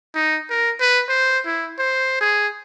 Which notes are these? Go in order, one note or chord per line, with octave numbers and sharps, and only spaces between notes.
D#4
A#4
B4
C5
E4
C5
G#4